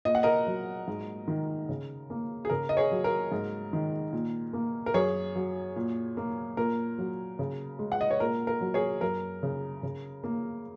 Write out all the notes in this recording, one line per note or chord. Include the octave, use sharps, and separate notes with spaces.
A#2 D#5
F#5
A#4 D#5
F#3
G#2
D#3
C#3
A#3
G#4
C#3 A#4
D#5
G#4 C#5
F#3
A#4
G#2
D#3
A#2
A#3
A#4
F#2 G#4 C#5
F#3
A#2
A#3
A#2 A#4
F#3
C#3
G#3
F#5
D#5
C#5
A#2 A#4
A#4
F#3
G#4 C#5
F#2 A#4
C#3
C#3
A#3